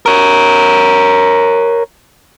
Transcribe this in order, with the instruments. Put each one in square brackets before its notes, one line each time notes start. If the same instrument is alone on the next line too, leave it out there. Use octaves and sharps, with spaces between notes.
[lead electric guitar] A#4 C#5